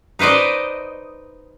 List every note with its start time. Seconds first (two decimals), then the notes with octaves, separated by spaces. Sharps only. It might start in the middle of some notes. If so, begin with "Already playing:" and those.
0.19 D#4 B4 C5 D5 D#5